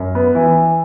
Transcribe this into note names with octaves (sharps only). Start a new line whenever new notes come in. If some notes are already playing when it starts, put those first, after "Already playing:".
Already playing: F#2
B3
E3